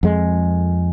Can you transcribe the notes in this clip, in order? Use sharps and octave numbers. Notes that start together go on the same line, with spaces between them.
F2 G#3